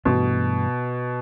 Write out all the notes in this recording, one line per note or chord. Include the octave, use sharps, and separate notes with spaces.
G2 B2 E3 A3